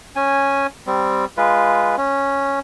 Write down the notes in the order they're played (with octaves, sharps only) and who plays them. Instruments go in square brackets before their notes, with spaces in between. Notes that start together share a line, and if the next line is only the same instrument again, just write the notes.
[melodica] C#4 G#5
G3 C4
G#3 F4 B4
C#4